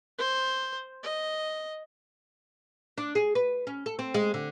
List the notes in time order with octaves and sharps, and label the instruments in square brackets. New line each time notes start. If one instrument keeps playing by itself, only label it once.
[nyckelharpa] C5
D#5
[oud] D4
G#4
B4
C#4
A4
C4
G#3
D3